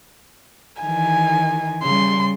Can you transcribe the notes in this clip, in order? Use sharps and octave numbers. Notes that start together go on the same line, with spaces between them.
D#3 E3 G#5
C#3 G3 C6